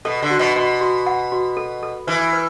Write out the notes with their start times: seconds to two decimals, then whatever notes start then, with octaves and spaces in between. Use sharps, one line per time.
0.05 B2 A4
0.22 D3
0.30 F#4
0.39 B2
0.55 B2 F#4
0.81 F#4
1.07 F#5
1.32 F#4
1.57 A4
1.83 A4
2.07 E3 B4
2.33 B4